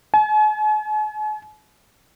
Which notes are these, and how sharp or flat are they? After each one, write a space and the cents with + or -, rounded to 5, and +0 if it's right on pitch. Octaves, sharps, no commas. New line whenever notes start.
G#5 +45